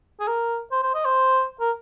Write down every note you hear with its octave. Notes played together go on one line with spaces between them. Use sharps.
G#4
A#4
C5
C5
D#5
C5
A#4